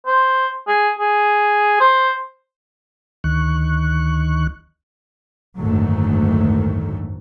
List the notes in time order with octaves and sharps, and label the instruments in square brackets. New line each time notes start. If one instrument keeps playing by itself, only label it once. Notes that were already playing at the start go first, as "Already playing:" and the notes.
[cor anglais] C5
G#4
G#4
C5
[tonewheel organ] D2 D#3 C#6 F#6
[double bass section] F#1 D2 G#2 D#3 F#3 A3